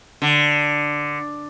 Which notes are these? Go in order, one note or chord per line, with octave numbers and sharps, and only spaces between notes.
D3